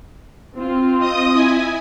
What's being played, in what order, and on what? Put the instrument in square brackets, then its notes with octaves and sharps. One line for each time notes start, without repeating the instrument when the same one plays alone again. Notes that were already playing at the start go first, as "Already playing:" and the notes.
[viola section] C4 F4
[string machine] D#5 D#6
E4 G#5